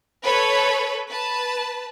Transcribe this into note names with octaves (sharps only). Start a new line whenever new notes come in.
A4 B4 C#5 B5
B4 A5